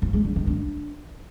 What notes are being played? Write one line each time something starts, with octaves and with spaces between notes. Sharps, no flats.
F3
G#3
D3
D#3
D4